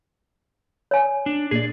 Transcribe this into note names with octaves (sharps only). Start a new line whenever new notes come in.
C#5 G#5
D4
A#2 A#3 G#4 D5